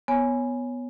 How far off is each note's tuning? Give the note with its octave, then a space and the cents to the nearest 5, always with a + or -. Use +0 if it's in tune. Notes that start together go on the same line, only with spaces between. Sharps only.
B3 +0 C#5 +0 G#5 +0